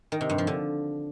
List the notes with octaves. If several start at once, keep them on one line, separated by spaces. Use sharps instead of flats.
D#3
C3
G2
F3
D3